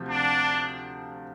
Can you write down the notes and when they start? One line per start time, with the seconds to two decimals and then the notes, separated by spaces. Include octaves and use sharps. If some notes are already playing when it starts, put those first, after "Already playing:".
Already playing: D2 C3 F3
0.08 D4